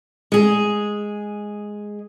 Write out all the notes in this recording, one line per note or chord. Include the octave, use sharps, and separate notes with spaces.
G#3 G#4